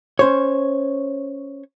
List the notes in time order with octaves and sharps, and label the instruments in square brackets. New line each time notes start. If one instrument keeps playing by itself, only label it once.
[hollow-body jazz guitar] C#4 C5 C#5